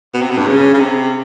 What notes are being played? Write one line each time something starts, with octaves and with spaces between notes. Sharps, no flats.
B2
C3
B2
G2
C#3
C#3
C3